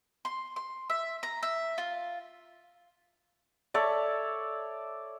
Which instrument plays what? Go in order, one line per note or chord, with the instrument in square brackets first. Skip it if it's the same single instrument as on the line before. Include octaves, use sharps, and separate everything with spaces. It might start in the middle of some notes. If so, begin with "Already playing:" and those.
[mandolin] C6
C6
E5
A#5
E5
F4
[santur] A4 C#5 D5 E5